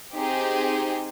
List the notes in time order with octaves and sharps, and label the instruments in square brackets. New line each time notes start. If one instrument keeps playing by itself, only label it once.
[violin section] C4 D#4 G4 G#4